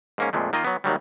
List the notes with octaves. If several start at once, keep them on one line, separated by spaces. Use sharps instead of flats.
G#2 A#3 C#4
F2 A#2 G#3 A3
D#3 A#3 F4 D#5
F#3 B3
D#2 D#3 F#3 G3